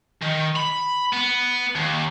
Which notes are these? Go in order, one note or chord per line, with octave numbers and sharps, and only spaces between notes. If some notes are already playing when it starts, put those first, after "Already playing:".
D#3
B5
B3
D#2